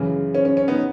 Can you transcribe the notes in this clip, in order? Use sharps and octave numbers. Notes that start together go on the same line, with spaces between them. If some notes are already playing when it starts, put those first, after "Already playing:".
Already playing: F#2 C#3 E3
C#4
C#4
C#4
B3 D#4